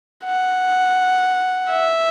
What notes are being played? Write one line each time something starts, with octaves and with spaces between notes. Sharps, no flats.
F#5
E5